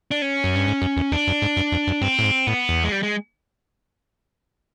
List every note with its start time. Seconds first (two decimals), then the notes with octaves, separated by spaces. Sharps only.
0.11 D4
0.22 C#4
0.44 F#2
0.56 G2
0.68 G#2
0.82 F#2
0.97 E2
1.12 E2 D4
1.27 F#2
1.42 G#2
1.57 F#2
1.72 F2
1.87 F#2
2.01 G2 C4
2.19 A2
2.24 G#2
2.47 A2 B3
2.69 E2
2.84 G#3
2.92 G3
3.03 G#3